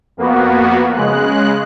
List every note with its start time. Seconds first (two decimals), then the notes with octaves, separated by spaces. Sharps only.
0.17 F2 A#3 B3 F#4
0.95 C#3 G#3 F#6